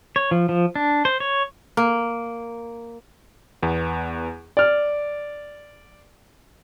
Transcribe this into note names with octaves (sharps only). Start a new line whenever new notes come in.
C#5
F3
F3
D4
C5
C#5
A#3
E2 B3
D5 F6